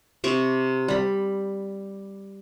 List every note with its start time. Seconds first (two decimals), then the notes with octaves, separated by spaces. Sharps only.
0.24 C3 C#6 D6
0.88 G3 B5